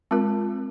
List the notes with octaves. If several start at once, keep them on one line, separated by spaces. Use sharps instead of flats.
G#3 C4 F4 A#4